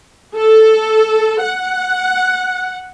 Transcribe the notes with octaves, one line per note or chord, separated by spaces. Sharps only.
A4
F#5